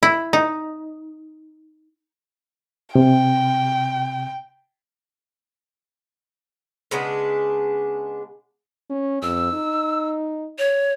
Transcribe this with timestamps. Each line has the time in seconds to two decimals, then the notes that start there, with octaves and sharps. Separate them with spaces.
0.03 E4
0.33 D#4
2.95 C3 G5
6.91 C#3 G#3 B3 D4
8.90 C#4
9.22 F2 E6
9.53 D#4
10.58 C#5